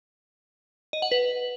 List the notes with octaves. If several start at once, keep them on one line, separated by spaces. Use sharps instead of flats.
D#5
F#5
B4